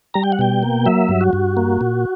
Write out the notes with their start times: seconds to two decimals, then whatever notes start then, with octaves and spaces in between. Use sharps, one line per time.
0.14 G3 A#5
0.24 G5
0.32 F#5
0.39 B2 G5
0.63 A#3
0.86 F#3 E5
1.09 G2
1.21 F#4
1.33 G2
1.57 A#3
1.81 A#2